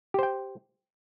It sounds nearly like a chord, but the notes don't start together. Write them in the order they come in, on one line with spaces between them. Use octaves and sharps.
G4 C5 G5